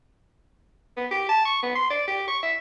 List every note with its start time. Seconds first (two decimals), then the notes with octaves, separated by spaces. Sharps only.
0.97 B3
1.11 G4
1.28 A5
1.45 C#6
1.63 B3
1.75 C6
1.90 D5
2.08 G4
2.28 C#6
2.43 E5